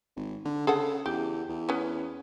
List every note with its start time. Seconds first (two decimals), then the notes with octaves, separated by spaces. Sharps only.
0.16 G#1
0.45 D3
0.67 C#3 G#4 A4 F#5
1.06 E2 G4
1.49 E2
1.69 B3 C#4